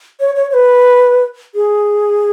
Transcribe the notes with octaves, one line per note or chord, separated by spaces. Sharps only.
C#5
C#5
C#5
B4
G#4